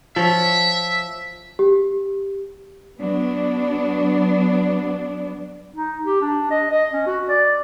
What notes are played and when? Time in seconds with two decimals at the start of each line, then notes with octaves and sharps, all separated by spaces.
0.16 F3 C#5 E5
1.59 G4
2.98 F#3 B3 D4
5.75 D#4
6.05 G4
6.21 D4
6.50 D#5
6.71 D#5
6.93 C#4
7.06 F#4
7.29 D5